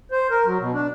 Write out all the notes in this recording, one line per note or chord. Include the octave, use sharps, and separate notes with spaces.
C5
A#4
F#3
B2
D4